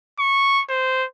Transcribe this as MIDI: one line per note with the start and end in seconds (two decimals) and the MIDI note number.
0.19 0.62 85
0.69 1.06 72